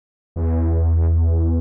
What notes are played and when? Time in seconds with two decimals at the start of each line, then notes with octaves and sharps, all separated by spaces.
0.36 E2